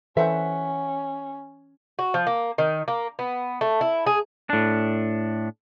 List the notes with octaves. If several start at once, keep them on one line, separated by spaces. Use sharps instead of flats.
E3 C#4 A4 B4 C5 E5 F#5
F#4
F3
A#3
D#3
A#3
B3
A3
E4
G#4
A2 D4